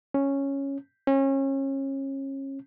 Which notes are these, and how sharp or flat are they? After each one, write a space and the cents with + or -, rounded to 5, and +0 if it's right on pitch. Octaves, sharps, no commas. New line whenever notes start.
C#4 -5
C#4 -30